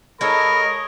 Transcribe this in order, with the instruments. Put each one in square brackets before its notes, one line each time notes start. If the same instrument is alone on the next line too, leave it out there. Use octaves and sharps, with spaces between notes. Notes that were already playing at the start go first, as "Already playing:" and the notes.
[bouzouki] G#3 D#4 A4 [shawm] A#4 [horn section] C#5 D#5 [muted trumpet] B5